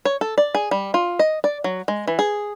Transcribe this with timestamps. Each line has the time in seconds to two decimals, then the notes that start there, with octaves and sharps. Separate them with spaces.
0.05 C#5
0.21 A4
0.38 D5
0.55 G#4
0.71 G3
0.94 F4
1.19 D#5
1.44 D5
1.64 F#3
1.88 G#3
2.07 E3
2.19 G#4